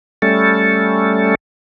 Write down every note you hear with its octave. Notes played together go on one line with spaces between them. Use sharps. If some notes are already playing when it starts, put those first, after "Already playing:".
G3 A3 C#4 A4